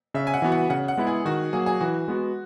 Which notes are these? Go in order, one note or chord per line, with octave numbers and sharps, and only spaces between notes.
C#3 E5
G#5
F#5
E3 B3 F#4
F#5
C#3 F#5
F#5
G#3 B3 E4
G#4
D#3 F#4
F#3 A#3 G#4
G#4
E3 F#4
G#3 B3 F#4